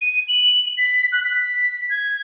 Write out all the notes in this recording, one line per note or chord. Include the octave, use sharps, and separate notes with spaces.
D#7
F#7
B6
F#6
B6
G#6